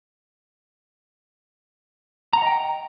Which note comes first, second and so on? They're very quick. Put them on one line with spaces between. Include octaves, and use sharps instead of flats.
A#5 F#5 D#5 G5